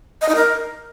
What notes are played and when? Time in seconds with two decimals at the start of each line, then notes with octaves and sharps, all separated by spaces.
0.21 D#5
0.29 D#4
0.36 A#4